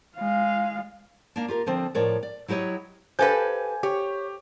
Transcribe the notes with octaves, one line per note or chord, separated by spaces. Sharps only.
G#3 F5
A#3 D4
F4 G4 A#4
D3 F3 C4
A2 F3 A#4 C#5 D5
D5
F#3 E4 G4 C#5 D#5
G4 A4 B4 C5 F5 G#5 G6
G4 C#5